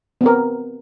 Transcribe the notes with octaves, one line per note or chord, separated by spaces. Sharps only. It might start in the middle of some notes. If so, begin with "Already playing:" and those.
B3 C4 A#4